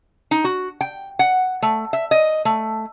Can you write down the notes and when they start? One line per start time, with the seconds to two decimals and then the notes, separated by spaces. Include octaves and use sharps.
0.31 D#4
0.44 F#4
0.81 G5
1.19 F#5
1.62 A3
1.93 E5
2.11 D#5
2.45 A3